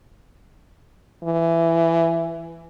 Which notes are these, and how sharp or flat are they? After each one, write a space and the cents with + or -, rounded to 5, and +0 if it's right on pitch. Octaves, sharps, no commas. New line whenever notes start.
E3 +15